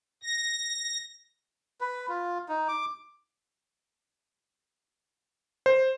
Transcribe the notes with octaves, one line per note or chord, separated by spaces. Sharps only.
A#6
B4
F4
D#4
D6
C5